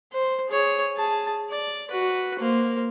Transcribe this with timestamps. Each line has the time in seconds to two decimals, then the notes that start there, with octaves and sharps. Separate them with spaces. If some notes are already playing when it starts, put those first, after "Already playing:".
0.13 C5
0.49 G#4 C#5
0.95 G#4 A5
1.50 D5
1.91 F#4 B4
2.39 A#3 C5